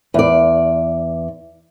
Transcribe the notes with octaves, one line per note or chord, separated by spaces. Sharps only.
E2 D5